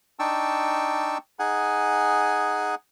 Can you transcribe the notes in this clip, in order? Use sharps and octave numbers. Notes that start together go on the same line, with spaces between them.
D4 D#4 G5 A5 C#6 E6
D#4 G#4 F#5 G#5